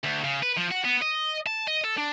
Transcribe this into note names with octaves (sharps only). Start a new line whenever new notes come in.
D2
C#3
B4
F3
F#4
B3
D#5
A5
D#5
A4
D4